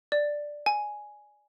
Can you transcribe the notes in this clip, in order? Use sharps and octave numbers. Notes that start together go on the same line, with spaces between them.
D5
G#5